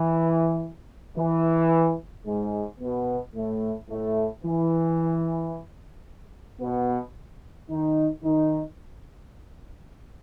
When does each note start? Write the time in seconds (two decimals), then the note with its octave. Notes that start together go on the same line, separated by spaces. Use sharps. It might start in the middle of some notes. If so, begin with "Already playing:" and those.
Already playing: E3
1.18 E3
2.26 G#2 G#3
2.80 B2 B3
3.35 A2 A3
3.89 A2 A3
4.44 E3
6.61 B2 B3
7.69 D#3 D#4
8.23 D#3 D#4